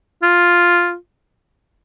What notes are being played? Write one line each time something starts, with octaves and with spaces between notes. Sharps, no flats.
F4